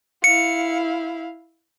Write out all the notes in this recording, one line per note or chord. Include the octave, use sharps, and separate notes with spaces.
E4 F5 C#7